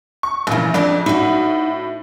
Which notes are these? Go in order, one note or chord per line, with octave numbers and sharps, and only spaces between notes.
C#6
A#1 A#2 C#3 E3
F2 D4 G#4 D5
A2 D#4 F#4